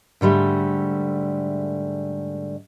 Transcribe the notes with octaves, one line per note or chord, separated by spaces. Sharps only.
G#2 D3 G3 A3